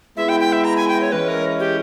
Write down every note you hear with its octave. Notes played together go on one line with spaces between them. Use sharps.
G#3 B3 E4 E5
G5
G5
E5
A#5
G#5
G5
C#5
E3 G#3 C#4 E4 B4
A#4
G4